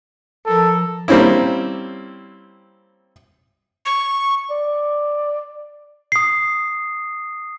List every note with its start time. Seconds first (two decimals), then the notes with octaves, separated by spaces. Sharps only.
0.46 F3 A4 A#4
1.08 G3 A#3 C4 C#4 E4
3.86 C#6
4.50 D5
6.12 D#6 C7